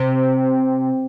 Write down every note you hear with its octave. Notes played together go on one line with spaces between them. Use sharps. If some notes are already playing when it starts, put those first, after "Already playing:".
Already playing: C3